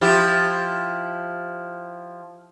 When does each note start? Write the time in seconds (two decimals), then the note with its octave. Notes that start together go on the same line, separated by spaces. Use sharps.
0.01 F3 E4 G4